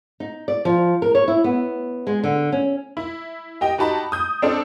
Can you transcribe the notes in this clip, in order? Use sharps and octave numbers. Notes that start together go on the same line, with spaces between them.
D#4
D5
F3
A#4
C#5
E4
B3
G#3
D3
C#4
E4
G4 D#5 G5
D#4 F#4 G4 A5 B5
D#6 G6
C4 D4 A4